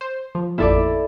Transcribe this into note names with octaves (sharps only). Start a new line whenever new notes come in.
C5
F3
A1 F2 A#2 E4 A4 D5